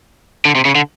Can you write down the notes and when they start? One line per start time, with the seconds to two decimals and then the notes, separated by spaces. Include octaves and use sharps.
0.45 D3
0.55 C3
0.65 C#3
0.75 D3